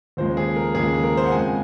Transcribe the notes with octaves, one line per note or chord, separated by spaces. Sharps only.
D#2 C#3 F3 G#3 C5
G#4
A#4
D#2 C#3 F3 G#3 G#4
A#4
C5
F#5
F2 C#3 G#3 G#5